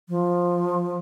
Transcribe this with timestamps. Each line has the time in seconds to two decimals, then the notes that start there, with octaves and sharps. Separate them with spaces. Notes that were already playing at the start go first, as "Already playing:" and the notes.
0.09 F3